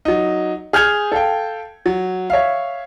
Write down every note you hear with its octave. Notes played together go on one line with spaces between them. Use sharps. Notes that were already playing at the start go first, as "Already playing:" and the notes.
F#3 D#4
G#4 F6 G6 G#6 F7
A4 F5 G5
F#3
C#5 E5 F5